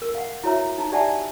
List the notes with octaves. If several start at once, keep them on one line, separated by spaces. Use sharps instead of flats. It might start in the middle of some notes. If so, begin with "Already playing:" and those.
A#4
F5 F#5
E4 F#4 C#5 E5 A#5
D#4 A#5
G4 D5 E5 F#5 G#5 A5